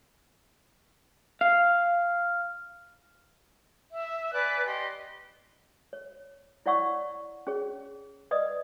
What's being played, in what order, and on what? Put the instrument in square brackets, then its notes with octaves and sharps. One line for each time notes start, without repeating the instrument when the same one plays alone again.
[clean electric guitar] F5
[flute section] E5
B4 D5 G#5 F#6
G4 D#5 C6
[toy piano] C#5
E4 C#5 D5 F#5 C#6 E6
C#4 G#4 C#5
B4 D5 D#5 D#6